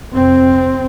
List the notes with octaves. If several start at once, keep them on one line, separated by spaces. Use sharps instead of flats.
F2 C3 C4